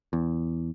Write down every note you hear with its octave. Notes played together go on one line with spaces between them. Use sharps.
E2